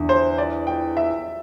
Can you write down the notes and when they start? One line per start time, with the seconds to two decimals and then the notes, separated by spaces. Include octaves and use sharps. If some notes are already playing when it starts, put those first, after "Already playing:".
Already playing: E2 D3 D4
0.09 C5
0.38 D5
0.67 G5
0.97 E5